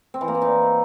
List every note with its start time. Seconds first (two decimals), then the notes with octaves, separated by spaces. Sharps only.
0.14 C4
0.21 E3
0.28 A#3
0.35 E3
0.42 D#4